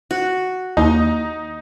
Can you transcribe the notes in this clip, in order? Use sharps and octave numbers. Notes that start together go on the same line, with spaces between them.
F#4
D#2 D#4